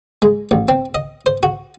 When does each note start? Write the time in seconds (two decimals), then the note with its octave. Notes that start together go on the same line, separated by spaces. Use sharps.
0.22 G#3
0.51 A1
0.68 C4
0.95 D#5
1.26 C5
1.43 F#4